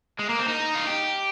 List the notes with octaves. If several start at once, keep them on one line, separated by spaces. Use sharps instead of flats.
G#3
A#3
C4
D#4
F4
G4